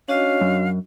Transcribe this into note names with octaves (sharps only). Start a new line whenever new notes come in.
C#4 D4 F#4 D#5 F5
F#2